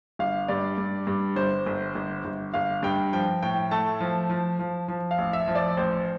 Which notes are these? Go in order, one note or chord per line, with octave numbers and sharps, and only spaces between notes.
G1 F5
G2 D5
G2
G2
G1 C5
G1
G1
G1
G1 F5
G2 G5
F3 G5
A2 G5
A3 A5
F3
F3
F3
F3
F5
A1
E5
F3
D5
A1 C5